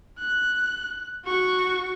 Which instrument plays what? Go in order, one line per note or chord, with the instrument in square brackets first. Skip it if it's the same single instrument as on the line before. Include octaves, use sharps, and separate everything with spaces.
[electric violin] F#6
F#4 C#6